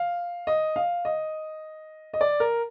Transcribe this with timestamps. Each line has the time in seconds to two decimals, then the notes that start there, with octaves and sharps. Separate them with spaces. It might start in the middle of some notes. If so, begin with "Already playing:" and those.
Already playing: F5
0.47 D#5
0.76 F5
1.05 D#5
2.14 D#5
2.21 D5
2.40 A#4